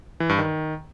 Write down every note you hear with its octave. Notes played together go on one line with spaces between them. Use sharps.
E3
G2
D#3